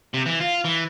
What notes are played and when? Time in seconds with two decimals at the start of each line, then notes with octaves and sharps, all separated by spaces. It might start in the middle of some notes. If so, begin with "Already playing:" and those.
0.14 C3
0.26 E3
0.40 F4
0.65 E3